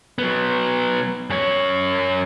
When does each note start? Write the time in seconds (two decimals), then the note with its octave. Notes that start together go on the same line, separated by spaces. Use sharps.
0.18 F#3 B3
1.30 F#2 C#5